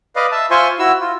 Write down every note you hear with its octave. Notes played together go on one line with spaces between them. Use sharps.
B4 D5 D#5 F5
E5 A5
F4 C5 E5 G#5 C6 C#6
E4 F#4 E6
F4